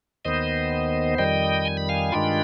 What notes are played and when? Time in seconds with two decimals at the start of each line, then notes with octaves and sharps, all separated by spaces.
0.25 D#2 D#3 B3 C5 D#5
1.18 F2 D#3 G3 D#5 G5
1.65 G#5
1.77 B5
1.89 F5 G#5
2.12 G2 D#3 G#3 D4 F4 G5 B5